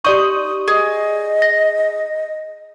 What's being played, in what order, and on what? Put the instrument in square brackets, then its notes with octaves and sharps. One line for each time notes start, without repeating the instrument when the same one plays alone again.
[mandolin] D#4 D#6 G6 [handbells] G4 D5 C#6
[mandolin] G#4 [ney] D#5
[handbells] A#6